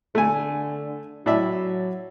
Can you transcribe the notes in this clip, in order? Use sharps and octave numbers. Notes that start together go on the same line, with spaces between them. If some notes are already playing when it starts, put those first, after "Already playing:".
D3 A3 G#5
A2 F#3 D5 E5